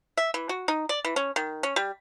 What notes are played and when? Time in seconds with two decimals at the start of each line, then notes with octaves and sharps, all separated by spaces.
0.17 E5
0.34 E3
0.49 F#4
0.68 D#4
0.89 D5
1.05 E3
1.16 C#4
1.36 D#3
1.63 C#4
1.76 G3